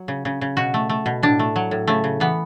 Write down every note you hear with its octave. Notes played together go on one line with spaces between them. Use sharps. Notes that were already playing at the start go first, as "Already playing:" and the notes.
Already playing: F#3
C#3
C#3
C#3
B2 F#4
A3
A3
B2
A2 D4
A3
F#3
A2
C#3 A3
C#3
E3 B3